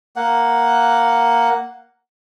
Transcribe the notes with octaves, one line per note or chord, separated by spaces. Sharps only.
A#3 F#5